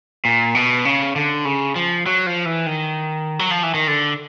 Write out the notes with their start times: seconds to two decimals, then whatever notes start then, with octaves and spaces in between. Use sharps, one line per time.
0.25 A#2
0.55 B2
0.85 C#3
1.16 D3
1.45 C#3
1.76 F3
2.06 F#3
2.26 F3
2.45 E3
2.66 D#3
3.39 F#3
3.51 F3
3.63 E3
3.74 D#3
3.87 D3